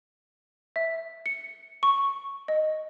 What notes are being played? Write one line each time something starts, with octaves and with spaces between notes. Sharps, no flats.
E5
C#7
C#6
D#5